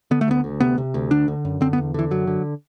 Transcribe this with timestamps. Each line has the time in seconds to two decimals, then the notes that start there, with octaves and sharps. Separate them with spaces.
0.11 D3 B3
0.21 A3
0.28 D2 B3
0.44 D2
0.60 C3 B3
0.78 C3
0.94 D2
1.11 D3 D4
1.28 D3
1.45 F#2
1.61 D3 C4
1.73 B3
1.78 E2
1.94 D3 E3
2.11 F#2 F#3
2.27 D3